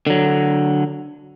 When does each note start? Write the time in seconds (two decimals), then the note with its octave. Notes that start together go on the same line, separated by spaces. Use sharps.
0.07 D3 F#3